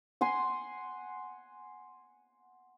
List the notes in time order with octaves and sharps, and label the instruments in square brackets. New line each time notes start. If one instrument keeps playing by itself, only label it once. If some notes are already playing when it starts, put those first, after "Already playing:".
[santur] F#5 G#5 C6